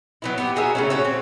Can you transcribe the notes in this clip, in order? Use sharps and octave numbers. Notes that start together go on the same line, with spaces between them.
F#3 B3 E4
B3 G4
F#4 G#4 A#4 E5
C#3 A3 C#4
C#4 F#4
C4